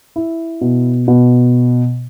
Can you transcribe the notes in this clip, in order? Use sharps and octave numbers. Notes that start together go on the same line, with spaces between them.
E4
B2
B2